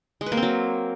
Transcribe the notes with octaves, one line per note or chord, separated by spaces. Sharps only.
G#3
B4
A#3
C4
F#3